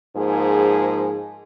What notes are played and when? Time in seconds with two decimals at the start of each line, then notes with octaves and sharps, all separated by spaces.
0.16 G#2 F3 A#3 G#4